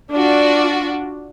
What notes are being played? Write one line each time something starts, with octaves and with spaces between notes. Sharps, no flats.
D4 F4 F#4 D5